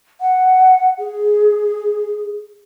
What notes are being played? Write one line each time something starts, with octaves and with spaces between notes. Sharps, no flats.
F#5
G#4